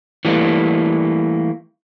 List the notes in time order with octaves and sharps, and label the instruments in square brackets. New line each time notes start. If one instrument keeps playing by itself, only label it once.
[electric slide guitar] E3 G3 A3 A#3